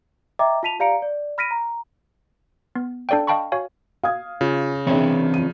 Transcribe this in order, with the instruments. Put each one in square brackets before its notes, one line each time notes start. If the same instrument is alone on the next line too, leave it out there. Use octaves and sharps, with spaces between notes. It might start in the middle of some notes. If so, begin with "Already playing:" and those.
[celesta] D#5 E5 G5 A#5 D6
F4 A5 B6 D#7 F7
G4 D5 F5 A#5 C#7 D7
D5
B5 F6 A#6 B6 D7 D#7
A#5
[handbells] B3
D4 A4 D5 F5 G5
D#5 F5 G5 A5 B5 C#6
F#4 C#5 F5 G#5
[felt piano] F5 D#6 G#6
[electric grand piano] C#3 [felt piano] F4
[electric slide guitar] E3 C4 C#5 [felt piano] D4 G#4 E5
[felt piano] F3 D#7